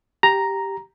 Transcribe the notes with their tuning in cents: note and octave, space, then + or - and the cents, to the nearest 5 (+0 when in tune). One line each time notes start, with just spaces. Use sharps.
G4 +0 A#5 +0